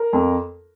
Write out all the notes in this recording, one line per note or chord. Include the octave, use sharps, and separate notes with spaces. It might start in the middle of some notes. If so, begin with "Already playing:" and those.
Already playing: A#4
F2